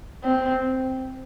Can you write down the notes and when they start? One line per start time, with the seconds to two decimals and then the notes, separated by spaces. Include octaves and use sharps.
0.24 C4